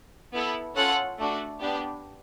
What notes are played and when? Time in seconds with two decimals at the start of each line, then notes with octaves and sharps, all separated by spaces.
0.34 B3 E4 A4
0.76 C#4 F4 A4 F#5
1.18 A3 D4 F#4
1.61 B3 D4 G4